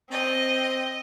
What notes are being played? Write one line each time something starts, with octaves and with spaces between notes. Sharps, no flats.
C4 D#5